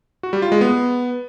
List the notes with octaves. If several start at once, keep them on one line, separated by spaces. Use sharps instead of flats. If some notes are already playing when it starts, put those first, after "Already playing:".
F#4
G3
F4
G#3
B3